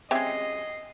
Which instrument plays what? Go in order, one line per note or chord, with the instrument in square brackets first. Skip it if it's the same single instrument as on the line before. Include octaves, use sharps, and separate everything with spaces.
[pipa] C#3 G#3 [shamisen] C4 G4 E5 [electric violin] D#5 C7